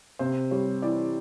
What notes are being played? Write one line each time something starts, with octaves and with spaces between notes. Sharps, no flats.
C3 C5
G3 C#5
E3 D5